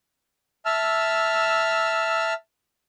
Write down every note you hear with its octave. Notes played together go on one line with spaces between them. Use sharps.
E5 A5 E6 F6